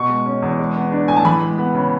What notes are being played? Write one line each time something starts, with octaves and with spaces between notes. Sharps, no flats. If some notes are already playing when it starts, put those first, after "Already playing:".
Already playing: B2 C#6
G#3
C#4
E2
G#3
B3
D4
A2 G#5
A5
E3 B5
G#3
B3
C#3